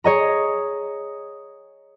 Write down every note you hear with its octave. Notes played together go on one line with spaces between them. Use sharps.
G#4 C#5 D#5 A#5